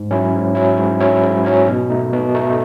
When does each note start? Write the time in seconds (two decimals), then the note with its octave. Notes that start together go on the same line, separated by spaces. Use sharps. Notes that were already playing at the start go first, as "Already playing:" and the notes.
Already playing: G#2
0.11 F#3 C#4 E4
0.34 G#2
0.55 F#3 C#4 E4
0.77 G#2
1.00 F#3 C#4 E4
1.23 G#2
1.44 F#3 C#4 E4
1.67 B2
1.90 A3 D#4
2.13 B2
2.35 A3 D#4